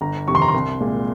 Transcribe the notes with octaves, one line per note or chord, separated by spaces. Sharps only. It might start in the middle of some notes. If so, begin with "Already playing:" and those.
G1 A#5
F2 C3 D#3 C#6
C6
A#5
C6
C2
A#2 G#3